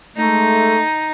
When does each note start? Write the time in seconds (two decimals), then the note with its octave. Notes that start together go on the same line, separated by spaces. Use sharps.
0.17 G#3 A3 D#4